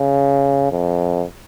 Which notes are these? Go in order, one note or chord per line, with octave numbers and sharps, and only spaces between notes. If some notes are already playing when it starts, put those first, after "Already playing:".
Already playing: C#3
F2